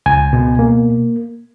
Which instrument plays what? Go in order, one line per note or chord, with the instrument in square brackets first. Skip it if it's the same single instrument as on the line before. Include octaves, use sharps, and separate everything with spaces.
[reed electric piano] C#2 G#5
B2
A#3